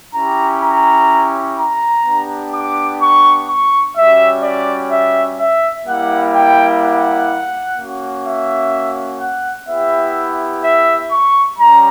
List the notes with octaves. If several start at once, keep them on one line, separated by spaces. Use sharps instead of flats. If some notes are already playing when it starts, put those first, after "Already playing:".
C#4 E4 G4 A#5
A#5
A#5
B3 D4 G4
D6
C#6
C#6
G3 C#4 F#4 E5
D5
E5
E5
G3 A#3 E4 F#5
G5
F#5
A#3 C#4 F#4
E5
F#5
B3 E4 G4 E5
E5
C#6
G3 C#4 A#5